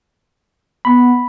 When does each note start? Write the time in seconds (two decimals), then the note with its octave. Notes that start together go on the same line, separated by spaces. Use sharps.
0.85 B3 B5